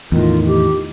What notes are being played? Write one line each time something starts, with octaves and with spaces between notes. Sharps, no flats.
E2 A2 D#3 F4
G4